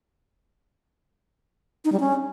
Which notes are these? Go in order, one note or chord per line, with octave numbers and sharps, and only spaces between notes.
D#4
G3
C#4